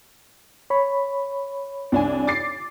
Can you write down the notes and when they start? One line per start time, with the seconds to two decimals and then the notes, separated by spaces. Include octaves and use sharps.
0.70 C#5 B5
1.92 C2 D4 G#5
2.27 D6 A6 C7